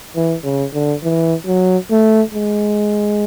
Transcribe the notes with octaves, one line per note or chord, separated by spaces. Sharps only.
E3
C#3
D3
E3
F#3
A3
G#3